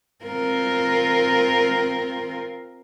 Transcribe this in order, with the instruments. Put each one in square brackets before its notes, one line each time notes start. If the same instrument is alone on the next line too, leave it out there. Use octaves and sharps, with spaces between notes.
[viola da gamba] C4 F4 A#4